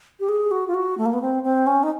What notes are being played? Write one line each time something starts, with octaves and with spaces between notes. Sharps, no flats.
G4
G#4
F#4
F4
F#4
A3
A#3
B3
C4
C4
C#4
D#4